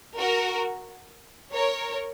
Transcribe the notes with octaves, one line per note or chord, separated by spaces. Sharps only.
F#4 A#4
A#4 C#5